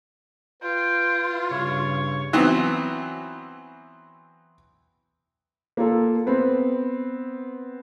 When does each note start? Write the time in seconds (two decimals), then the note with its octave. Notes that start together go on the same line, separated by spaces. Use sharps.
0.62 F4 B4 G5
1.51 G2 C#3 C#5
2.33 E3 F#3 B3 C4
5.77 A#3 F4 A4
6.27 B3 C4